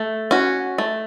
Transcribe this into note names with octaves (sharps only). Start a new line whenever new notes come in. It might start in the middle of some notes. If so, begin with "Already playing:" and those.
Already playing: A3
C#4 F#4
A3